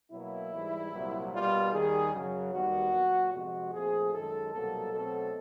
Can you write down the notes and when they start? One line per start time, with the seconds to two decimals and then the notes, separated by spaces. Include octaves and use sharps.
0.12 B2 F#3 A#3 E4
0.53 G#2 E3 G3
0.93 C2 A#2 F#3
1.32 B2 G3 A#3 F4
1.73 D#2 D#3 G3 G#4
2.13 F#2 C#3 F#3
2.52 D#2 D#3 G3 B3 F#4
2.93 A#2 F#3 B3
3.33 F2 C3 F3 G#3 F#4
3.73 A#2 F3 A3 C4 G#4
4.13 F#2 D#3 G#3 A4
4.53 C2 B2 F#3 A#3 A4
4.93 B2 F#3 A3 C4 A4